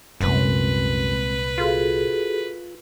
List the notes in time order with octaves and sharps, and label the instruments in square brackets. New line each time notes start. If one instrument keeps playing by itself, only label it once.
[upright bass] C2 A#2 [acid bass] F#2 [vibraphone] G#3 C4 [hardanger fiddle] B4
[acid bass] F4 [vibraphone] F#4 G#4 A4